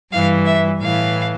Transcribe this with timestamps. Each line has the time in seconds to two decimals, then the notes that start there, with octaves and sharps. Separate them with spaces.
0.12 G2 E3 F5
0.46 E5
0.81 A2 E3 F5